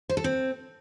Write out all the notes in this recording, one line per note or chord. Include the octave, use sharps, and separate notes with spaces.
C5
A4
C4